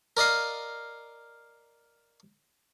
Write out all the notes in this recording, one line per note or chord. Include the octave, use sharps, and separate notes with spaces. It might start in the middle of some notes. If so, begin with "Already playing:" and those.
A#4 D5 D#5 F5